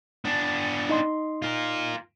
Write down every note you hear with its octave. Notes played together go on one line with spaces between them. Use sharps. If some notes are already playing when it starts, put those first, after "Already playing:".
B3 D4
D#4 D#5 C6
F4 A#4